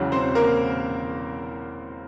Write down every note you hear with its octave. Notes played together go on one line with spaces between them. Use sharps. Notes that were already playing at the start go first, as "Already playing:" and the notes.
Already playing: E1 E2 C#3 F#3
C4 C5
A#3 A#4